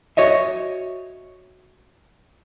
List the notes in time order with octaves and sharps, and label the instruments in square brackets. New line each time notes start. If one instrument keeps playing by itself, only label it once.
[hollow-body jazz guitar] F#4 C#5 D#5 E5